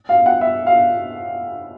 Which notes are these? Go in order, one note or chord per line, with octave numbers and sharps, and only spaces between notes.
F5
F#5
E5
F5